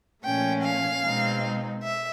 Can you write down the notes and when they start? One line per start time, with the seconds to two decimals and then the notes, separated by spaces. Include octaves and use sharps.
0.25 A#2 F3 A3 C#4 G5
0.64 F5
1.04 B2 G#3 C4 D#4
1.83 E5